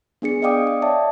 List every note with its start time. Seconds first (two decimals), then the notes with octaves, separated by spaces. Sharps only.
0.22 B3 D4 G#4 C#7
0.42 D5 D#5 F5 G5 D6 D#6
0.67 D#6
0.82 C#5 D5 E5 A5